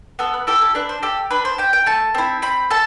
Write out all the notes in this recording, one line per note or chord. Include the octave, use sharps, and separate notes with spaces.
B3 A4
B4
E4 G4 A4
A4
D4 B4
C5
G4 A4
D4 B4
C5
G4 G5
G5
A3 A5
C4 E4
C4 B5
A4 A5